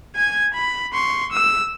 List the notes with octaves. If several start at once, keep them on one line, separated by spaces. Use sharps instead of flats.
G#5 G#6
B5
C6 C#6
E6